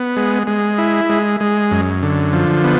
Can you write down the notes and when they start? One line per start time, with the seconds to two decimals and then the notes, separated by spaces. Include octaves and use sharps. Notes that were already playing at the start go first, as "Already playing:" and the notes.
Already playing: B3
0.17 G#3
0.47 G#3
0.78 E4
1.09 G#3
1.40 G#3
1.71 F#2
2.03 D3
2.33 F3
2.64 B3